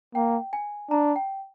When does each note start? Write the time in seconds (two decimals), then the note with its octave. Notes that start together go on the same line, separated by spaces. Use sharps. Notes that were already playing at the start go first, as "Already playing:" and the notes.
0.15 A#3 G5
0.53 G#5
0.90 D4 A#5
1.16 G5